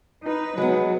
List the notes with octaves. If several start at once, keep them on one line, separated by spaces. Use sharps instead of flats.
D#4 B4
F#3 G#3 B3